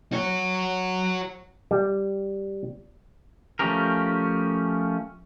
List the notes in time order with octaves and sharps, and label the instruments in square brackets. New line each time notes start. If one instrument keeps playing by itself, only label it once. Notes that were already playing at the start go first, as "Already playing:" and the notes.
[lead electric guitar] F#4 C#5
[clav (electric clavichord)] G3
[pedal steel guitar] F3 A3 C#4 G4 A#4